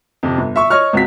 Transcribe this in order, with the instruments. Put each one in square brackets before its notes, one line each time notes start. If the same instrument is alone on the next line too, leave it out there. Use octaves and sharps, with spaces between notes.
[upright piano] F2 C3
G1
E5 C#6
C#5 D#5 C#6 F6
C#2 C4 F#4 B6